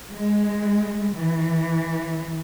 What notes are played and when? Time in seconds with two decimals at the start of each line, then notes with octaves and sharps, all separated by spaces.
0.11 G#3
1.15 E3